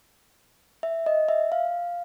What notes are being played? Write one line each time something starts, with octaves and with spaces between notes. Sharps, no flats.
E5
D#5
E5
F5